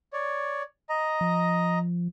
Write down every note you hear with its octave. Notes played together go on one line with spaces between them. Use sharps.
C#5 D5
D#5 A#5
F3